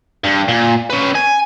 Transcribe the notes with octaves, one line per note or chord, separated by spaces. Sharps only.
G2
A#2
C#4 B4
G#5